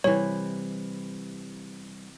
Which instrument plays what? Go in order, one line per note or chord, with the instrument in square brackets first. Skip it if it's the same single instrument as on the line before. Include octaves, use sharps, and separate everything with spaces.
[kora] C3 E3 [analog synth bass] G3 [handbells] C#5